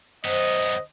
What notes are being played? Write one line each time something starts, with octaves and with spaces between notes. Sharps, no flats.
F#2 B3 C5 D#5